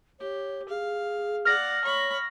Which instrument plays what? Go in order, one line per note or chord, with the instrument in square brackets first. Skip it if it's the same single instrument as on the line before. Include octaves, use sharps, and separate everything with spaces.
[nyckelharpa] G4 [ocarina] C#5
[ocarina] G#4 [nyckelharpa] F5
[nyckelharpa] D5 F#5 [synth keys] F6 A#6
[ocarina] C#5 [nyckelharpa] B5 C#6